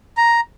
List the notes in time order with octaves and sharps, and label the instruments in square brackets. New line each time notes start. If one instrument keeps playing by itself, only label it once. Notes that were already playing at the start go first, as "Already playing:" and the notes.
[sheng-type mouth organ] A#5